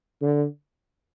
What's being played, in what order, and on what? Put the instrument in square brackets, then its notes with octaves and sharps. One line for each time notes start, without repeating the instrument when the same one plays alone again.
[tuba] D3